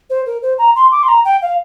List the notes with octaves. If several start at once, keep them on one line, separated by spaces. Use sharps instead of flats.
C5
A#4
C5
A#5
C6
D6
C6
A#5
G5
F5